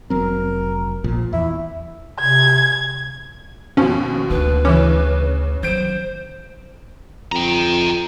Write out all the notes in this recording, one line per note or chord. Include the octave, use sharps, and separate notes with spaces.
F1 F#3 C4 A#4
A#1 A#2 F3
E2 E4
C3 G#6
D#2 B2 F3 C#4
D2 D4 B4
C#3 E3 C#4 D6
D#3 F#3 C5 G6 D7
F2 G5 A#5